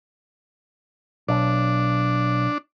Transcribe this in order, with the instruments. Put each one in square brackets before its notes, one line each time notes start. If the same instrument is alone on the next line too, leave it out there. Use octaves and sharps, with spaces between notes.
[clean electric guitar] B1 [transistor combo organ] D4